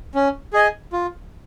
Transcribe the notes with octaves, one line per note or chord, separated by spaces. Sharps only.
C#4
G#4 D#5 G#5
F4